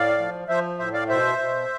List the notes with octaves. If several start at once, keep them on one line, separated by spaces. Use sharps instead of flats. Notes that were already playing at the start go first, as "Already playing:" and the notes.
Already playing: A2 D5 F5
F3
F3 C5 E5
A2 C5 E5
D5 F5
B2 C5 E5
B2